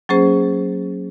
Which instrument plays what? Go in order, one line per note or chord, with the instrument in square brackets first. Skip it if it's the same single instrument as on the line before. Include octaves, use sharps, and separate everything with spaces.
[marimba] F#3 A#3 C#4 G#4 C5